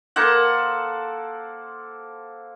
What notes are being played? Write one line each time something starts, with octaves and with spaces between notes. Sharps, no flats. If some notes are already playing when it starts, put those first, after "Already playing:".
A#3 A4 C5 F#5